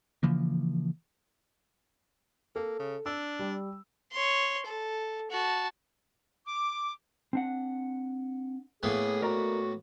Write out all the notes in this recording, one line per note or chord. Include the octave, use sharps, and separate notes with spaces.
C#3 E3 F3 A#3
A#3 A4
C#3
D4 E6
G3
C#5 C6
A4
F#4 A5
D6
C4 D4 F#5
A2 A#3 B3 G#4
F#4 A#4 D5 A#5